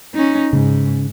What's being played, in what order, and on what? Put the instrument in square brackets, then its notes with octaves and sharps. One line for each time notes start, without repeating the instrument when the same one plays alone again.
[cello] C#4 D#4
[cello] G#2 [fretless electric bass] C#3